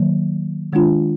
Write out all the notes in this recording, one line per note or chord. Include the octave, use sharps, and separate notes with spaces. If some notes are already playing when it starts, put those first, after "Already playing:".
Already playing: D#3 F#3 A#3
D#3 G#3 D4 F4